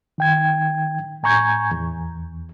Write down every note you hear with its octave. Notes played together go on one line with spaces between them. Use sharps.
D#3 G5 G#6
A2 G#5 A#5 C#6 G6 G#6
E2